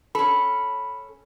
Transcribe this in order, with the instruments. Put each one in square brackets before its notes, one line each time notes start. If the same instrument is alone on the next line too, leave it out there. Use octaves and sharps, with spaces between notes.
[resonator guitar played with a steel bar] C#4 A4 [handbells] B5